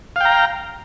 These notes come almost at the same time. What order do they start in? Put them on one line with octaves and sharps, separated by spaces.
F5 G5 A#5